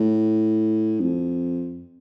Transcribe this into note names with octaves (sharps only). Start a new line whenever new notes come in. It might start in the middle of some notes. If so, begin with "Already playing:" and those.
Already playing: A2
F2